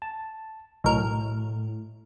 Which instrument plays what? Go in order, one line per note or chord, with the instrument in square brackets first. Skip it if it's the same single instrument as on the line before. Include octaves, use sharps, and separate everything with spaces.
[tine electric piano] A5
[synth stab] B1 A#4 [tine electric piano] A2